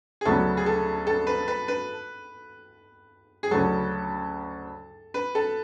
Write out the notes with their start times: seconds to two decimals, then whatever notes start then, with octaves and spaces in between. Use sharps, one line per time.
0.21 G#4
0.25 D2 C#3 F#3 B3 A4
0.57 G#4
0.66 A4
1.07 A4
1.27 B4
1.48 B4
1.68 B4
3.43 G#4
3.51 D2 C#3 F#3 A4
5.14 B4
5.35 A4